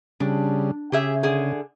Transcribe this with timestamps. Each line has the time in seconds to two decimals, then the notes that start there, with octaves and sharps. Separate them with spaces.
0.20 C#3 G3 D4
0.92 C#3 G4 G#4 E5
1.23 D3 G#4